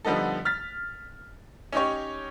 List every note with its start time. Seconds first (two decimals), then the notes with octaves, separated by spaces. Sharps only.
0.05 D3 F3 G3 B3 D#4 A4
0.45 F6 A6 B6
1.73 C#4 D#4 G4 C#5